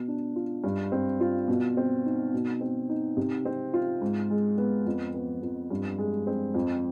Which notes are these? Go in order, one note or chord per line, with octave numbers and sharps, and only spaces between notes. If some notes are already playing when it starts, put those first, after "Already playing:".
Already playing: B2
D4
F4
G2
C4
F4
B2
C4
D#4
B2
C4
D#4
C3
C4
F4
G#2
G#3
B3
F2
B3
F2
G2
G#3
C4
F2